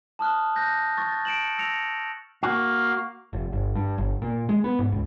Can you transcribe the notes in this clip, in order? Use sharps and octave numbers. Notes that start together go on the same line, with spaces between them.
A5 D#6 F6 F#6
F#6 G6 A#6
C#6 A6
A6
C#7 D7 E7 F#7
E6 A#6 C#7 F7
A#3 F#4 F5
F1
G1
G2
G1
A#2
G#3
B3
G#2
C#2